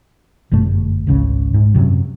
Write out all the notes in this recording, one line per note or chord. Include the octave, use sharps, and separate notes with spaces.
G1 F#2 B2 A3
G#1 C#2 C#3
G#2
F#2 C3 F#3